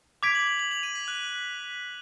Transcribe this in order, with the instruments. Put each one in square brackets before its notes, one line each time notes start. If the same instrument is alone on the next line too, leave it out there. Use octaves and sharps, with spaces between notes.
[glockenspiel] D6 G#6 B6 D7 [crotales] F7
[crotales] F#7
F#7
F#7
F7
D#7
B6
F#6